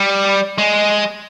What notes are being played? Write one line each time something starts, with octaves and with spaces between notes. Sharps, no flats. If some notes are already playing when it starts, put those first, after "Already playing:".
Already playing: G3
G#3